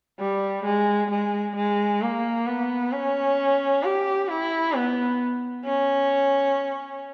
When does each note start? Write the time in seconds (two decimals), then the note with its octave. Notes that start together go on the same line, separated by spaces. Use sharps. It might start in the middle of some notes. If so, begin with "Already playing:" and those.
0.19 G3
0.65 G#3
1.11 G#3
1.56 G#3
2.01 A#3
2.47 B3
2.92 C#4
3.83 G4
4.28 E4
4.73 B3
5.65 C#4